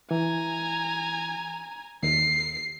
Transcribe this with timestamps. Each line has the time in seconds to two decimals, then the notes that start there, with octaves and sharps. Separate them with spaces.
0.11 E3 G#5 A#5
2.03 D#2 C7